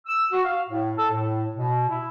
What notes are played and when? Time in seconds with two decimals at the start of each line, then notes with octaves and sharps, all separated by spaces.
0.06 E6
0.32 F#4
0.44 F5
0.69 A2
0.97 A4
1.11 A2
1.56 B2
1.88 E4